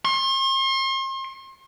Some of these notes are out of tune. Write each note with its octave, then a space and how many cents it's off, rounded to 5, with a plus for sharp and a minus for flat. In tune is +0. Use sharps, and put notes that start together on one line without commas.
C6 +40